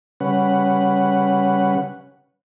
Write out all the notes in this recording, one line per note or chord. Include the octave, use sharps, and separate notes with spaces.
C#3 G3 C#4 B4 F#5